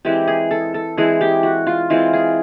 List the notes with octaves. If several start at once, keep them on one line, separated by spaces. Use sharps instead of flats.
E3 G#3 C4 G4
G#4
A4
A4
E3 G#3 C4 G#4
G4
F#4
F4
E3 G#3 C4 F4
G#4